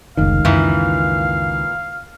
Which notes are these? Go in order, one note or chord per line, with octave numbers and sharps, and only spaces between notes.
F1 C#2 D#3 D#4 F5
F#2 A#2 E3